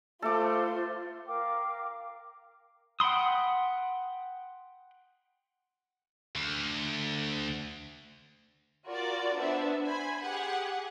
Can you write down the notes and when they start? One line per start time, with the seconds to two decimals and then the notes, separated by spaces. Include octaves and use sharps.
0.22 A3 F4 A4 C5 D6
1.27 A#4 F5 G5 D6
3.00 F#5 G5 B5 C6 D#6
6.36 D2
8.86 F4 F#4 A#4 D5
9.35 B3 D4 C5 E5
9.84 C5 G#5 B5
10.22 G4 G#4 F#5